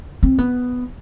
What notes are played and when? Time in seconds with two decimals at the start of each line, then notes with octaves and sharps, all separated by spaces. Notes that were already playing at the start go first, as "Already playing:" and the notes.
0.23 C4
0.38 B3